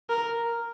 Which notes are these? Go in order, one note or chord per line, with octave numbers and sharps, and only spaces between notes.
A#4